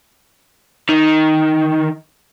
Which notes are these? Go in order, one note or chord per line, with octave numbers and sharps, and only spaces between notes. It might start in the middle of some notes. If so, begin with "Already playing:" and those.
D#3